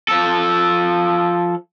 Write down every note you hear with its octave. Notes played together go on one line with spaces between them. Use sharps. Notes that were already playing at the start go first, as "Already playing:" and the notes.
F3 A4